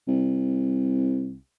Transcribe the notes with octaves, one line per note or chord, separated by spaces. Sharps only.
C2